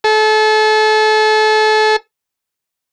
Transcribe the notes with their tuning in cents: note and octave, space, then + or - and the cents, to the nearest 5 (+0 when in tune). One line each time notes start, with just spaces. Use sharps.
A4 -30